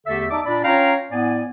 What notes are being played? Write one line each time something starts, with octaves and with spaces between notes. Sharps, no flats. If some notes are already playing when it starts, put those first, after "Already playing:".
E2 D3 A3 G4 A4 E5
D#4 D5 E5 A5 D6
A#2 D4 D5 B5
C#4 F4 C#5 F5 G5 A#5
A2 B3 D5 G#5